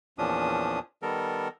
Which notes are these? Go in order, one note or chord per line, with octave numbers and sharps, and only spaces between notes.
E2 A#2 F3 C#4 D4 D#6
D#3 G3 B3 A4 A#4